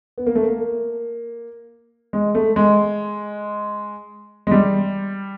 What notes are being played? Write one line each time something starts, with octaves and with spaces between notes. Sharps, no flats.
B3
A#3
A3
A#3
G#3
A3
G#3
G#3
G3